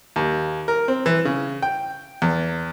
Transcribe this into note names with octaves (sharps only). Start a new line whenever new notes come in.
D#2
A#4
C4
E3
C#3
G5
E2